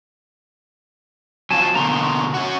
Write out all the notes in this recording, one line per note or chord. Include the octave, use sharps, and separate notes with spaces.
F#3 C4 F4 G#5 A5
B2 D3 A#3 A#5 C6 C#6
C#4 F#4